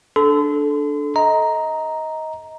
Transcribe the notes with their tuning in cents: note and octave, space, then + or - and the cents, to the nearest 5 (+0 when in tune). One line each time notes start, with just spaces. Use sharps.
D4 +0 A4 -15 C6 -40
D#5 +20 A#5 +0